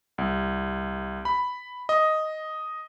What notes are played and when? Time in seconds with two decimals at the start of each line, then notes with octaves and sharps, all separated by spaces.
0.18 C2
1.25 B5
1.89 D#5